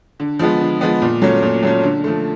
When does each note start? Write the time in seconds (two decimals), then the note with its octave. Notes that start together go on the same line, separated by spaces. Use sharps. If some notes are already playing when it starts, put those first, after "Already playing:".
0.20 D3
0.39 F3 G#3 B3
0.61 D3
0.81 F3 G#3 B3
1.02 A#2
1.22 F#3 A3 C#4
1.42 A#2
1.63 F#3 A3 C#4
1.83 D3
2.04 F3 A3